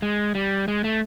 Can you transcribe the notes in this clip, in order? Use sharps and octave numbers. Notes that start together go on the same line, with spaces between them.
G#3
G3
G#3
A3